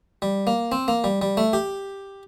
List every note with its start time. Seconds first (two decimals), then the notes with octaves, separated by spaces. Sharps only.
0.22 G3
0.47 A#3
0.72 C4
0.88 A#3
1.04 G3
1.22 G3
1.37 A3
1.53 G4